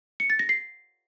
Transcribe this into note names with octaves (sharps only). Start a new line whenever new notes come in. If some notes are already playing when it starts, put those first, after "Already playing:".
C#7
A6
A#6
C7